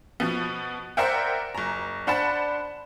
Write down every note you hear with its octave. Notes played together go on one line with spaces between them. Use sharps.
B2 F3 B3
A#4 C5 D5 E5 F#5 G5
F#1 A#5
D4 C5 F#5 A5 B5